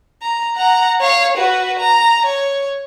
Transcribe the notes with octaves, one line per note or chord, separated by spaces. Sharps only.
A#5
F#5 A#5
C#5 F5
F#4 B4
A#5
C#5